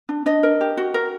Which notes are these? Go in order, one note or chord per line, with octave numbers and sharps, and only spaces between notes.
D4
D4 D#5
A#4
G4
F#4
A#4